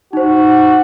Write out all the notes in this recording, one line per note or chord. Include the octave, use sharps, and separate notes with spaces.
D#4 F#4 C5